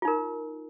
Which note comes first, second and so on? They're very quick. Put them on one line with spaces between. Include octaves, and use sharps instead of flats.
F4 D#4 A#4